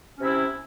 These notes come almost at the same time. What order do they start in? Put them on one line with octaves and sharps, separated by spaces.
C#4 C3 E4